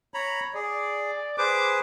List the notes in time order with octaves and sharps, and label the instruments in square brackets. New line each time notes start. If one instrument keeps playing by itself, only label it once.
[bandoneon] C#5 A#5 B5
[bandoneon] G#4 [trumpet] D5
[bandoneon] G#4 B4 C5 [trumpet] D6